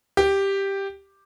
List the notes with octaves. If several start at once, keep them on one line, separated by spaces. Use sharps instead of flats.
G4